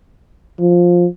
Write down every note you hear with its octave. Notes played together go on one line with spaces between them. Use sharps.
F3